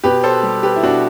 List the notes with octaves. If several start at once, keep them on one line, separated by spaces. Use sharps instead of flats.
B2 G4 B4
A4 C5
G3
G4 B4
E4
B2 D4 F#4